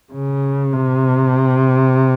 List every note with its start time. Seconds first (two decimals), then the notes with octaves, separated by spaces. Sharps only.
0.13 C#3
0.74 C3